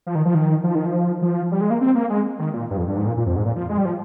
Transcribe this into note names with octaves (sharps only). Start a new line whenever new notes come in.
F3
D#3
F3
D#3
F3
D#3
F3
F3
G3
G#3
A#3
C4
A#3
G#3
D#3
A#2
G2
F2
G2
G#2
A#2
A#2
F2
G#2
A#2
F3
G#3
G3
F3